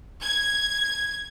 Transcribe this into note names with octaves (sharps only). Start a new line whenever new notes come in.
G#6